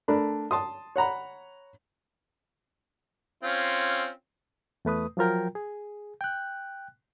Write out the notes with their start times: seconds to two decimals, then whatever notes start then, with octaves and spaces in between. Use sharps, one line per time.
0.08 A3 D4 A#4 B5
0.51 A5 C6 D#6
0.96 C#5 F#5 A#5 B5
3.43 C4 C#4 F4
4.85 E2 A3 B4 D#6
5.17 F3 F#3 F4 A#4 G5
5.55 G#4
6.21 G5 F#6